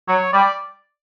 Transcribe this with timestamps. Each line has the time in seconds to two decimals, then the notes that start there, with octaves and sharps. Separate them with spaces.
0.08 F#3 C#5
0.33 G3 D5